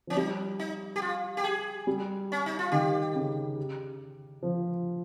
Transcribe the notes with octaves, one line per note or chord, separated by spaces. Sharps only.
F3 C#4
G3 D#4
D#4
G4
F4
G4
G#4
G3
C#4
D#4
F4
D#3 G4
C#3
F3